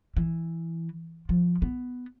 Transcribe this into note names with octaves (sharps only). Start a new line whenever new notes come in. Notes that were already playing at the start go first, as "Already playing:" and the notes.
E3
F3
B3